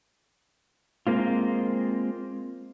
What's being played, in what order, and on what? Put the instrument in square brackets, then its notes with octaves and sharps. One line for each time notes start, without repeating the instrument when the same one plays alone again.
[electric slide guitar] G#3 A#3 C4 F4